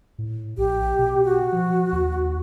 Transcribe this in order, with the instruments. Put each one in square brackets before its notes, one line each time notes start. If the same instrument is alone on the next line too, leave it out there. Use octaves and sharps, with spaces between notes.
[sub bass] A2
[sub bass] A#1 [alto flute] G4
[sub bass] B2
[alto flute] F#4
[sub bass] F3
D#2